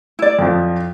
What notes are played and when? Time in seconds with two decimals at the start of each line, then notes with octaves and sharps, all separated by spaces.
0.19 E4 D5
0.39 F2 F3